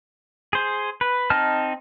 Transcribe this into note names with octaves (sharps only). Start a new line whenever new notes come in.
G#4 C5
B4
C4 D#4 D#5 A5 F6